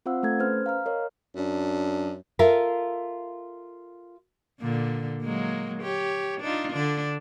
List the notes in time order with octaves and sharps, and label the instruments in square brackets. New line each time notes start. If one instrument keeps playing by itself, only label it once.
[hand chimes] C4 F4 C5 F5 F#5 E6
A3 A4 G#6
C#4 B4 C5 F6
F5 A#5 F6
A#4 C#5 D#5
[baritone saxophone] F#2 [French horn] D4
[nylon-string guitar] F4 A4 A#4 E5 F5
[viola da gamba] A#2 D3
F#3 G#3 A#3
G4 C#5
D4 D#4 F4
D3 D4